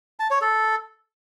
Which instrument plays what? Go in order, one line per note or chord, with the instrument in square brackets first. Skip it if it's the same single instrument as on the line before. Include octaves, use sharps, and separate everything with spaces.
[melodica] A5
C#5
A4